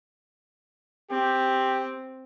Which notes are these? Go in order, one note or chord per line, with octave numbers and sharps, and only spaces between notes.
C4 G4